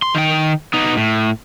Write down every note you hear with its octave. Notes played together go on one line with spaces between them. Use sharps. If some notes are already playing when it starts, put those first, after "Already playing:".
C6
D#3 G5
B3 D#4
A2